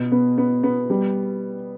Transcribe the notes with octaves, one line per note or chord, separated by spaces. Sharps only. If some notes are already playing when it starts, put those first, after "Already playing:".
Already playing: B2
B3
B3
B3
G3